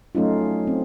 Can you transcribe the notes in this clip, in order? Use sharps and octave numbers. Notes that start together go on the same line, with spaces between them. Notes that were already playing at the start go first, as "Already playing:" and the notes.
F#3 A3 C#4 D#4 F4
C4